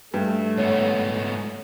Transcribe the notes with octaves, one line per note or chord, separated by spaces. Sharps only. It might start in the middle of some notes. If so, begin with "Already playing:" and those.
G2 A3
G#2 B3 C#5